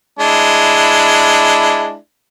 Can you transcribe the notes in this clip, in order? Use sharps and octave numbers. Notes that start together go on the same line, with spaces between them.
G#3 D4 E4